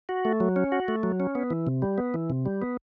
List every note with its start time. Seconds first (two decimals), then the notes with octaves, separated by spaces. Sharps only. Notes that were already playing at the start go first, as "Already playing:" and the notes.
0.09 F#4
0.25 A3
0.40 F#3
0.56 C#4
0.72 F#4
0.88 A3
1.03 F#3
1.20 C#4
1.35 B3
1.50 E3
1.67 C3
1.82 G3
1.98 B3
2.14 E3
2.30 C3
2.46 G3
2.62 B3